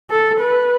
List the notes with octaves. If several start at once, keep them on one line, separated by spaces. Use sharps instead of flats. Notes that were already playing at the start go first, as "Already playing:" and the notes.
A4
B4